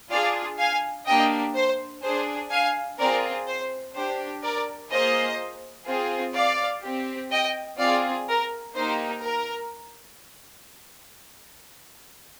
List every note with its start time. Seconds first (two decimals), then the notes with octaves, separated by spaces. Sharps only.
0.11 D4 F4 G#4 D5 F5
0.59 F5 G#5
1.07 A#3 D4 G4 D#5 G5
1.55 C5
2.03 D4 G#4 C5
2.51 F5 G#5
2.99 C4 F4 G#4 A#4 D5
3.47 C5
3.95 D4 G4 C5
4.43 A#4 D5
4.91 A#3 F4 G#4 C5 D#5
5.87 C4 F4 G#4
6.35 D5 F5
6.83 C4 G4
7.31 D#5 G5
7.79 C4 F4 G#4 D5 F5
8.28 A#4
8.75 A#3 D#4 G4 C5
9.23 A#4